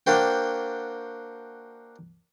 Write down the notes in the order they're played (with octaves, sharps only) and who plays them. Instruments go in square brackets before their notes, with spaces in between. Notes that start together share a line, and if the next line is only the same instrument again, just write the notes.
[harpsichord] A#3 D4 F#4 C5 G5